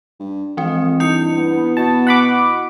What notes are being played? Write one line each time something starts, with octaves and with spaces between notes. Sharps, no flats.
G2
E3 F3 G#3 C4
G2 D#4 E4 D#6 C#7
B3
B2 A5
F#5 B5 D6